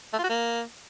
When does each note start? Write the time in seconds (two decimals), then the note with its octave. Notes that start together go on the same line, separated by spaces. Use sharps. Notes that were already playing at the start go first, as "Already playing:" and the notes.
0.13 A3
0.18 F4
0.24 F#4
0.29 A#3